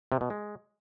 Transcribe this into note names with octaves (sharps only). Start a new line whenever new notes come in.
C3
B2
G#3